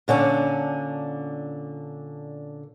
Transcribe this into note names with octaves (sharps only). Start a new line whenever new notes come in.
A#2 D3 C#4 D4